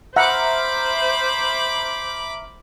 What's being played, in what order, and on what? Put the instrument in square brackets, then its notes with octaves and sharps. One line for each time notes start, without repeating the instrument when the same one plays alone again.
[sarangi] C5 [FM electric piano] E5 A#5 F6 [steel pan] F#5 [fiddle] B5 D6